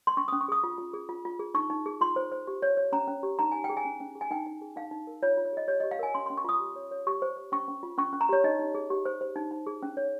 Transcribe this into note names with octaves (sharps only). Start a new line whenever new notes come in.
C6
C#4 C#6
D#6
C#4
C#6
G#4 D#6
F4
F4
G#4
F4
F4
G#4
D#4 C#6
D#4
G#4
F4 C6
C5
C5
G4
C#5
C#5
C#4 A#5
C#4
G4
D#4 A#5
D#4 G#5
G5
G#4
G#5
C#4
C#4
G#4
G#5
D#4 G5
D#4
G#4
D#4 F5
D#4
A#4
F4 C#5
F4
C#5
G#4 D#5
G4 C#5
D#5
G4
F5
A#4 G#5
C#4 C6
C6
C#4
C#6
F4 D#6
G4
C#5
C#5
G4 C#6
C5
C5
C#4 C#6
C#4
F4
C#4 C#6
C#4
A#5
G4 C#5
D#4 D#5
D#4
G#4
G4
C5
C5
D#4
D#4
G#4
C#4
C#5